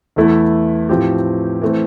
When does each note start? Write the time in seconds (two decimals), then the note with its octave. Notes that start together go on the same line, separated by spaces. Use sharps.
0.16 E2 E3 A3 E4
0.89 A2 F3 C4 G4
1.61 E3 A3 C4